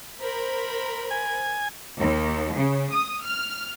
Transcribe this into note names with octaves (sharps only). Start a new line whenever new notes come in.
A#4 C5 B5
G#5
D#2
C#3
D#6
F6